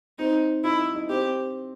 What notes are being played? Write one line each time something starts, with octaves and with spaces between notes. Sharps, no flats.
C4 D#4
D#4 E4
E4
D#4
C4 G4